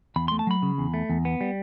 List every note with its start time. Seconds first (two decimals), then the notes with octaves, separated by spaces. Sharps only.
0.16 E2 B5
0.28 A3 C6
0.39 A5
0.47 F#3 B5
0.62 C#3
0.78 E2
0.94 A3
1.10 E2
1.25 B3
1.41 G3